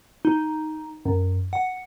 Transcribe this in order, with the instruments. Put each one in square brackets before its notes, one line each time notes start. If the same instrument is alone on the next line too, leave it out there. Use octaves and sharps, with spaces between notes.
[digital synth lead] D#4
F#2
F#5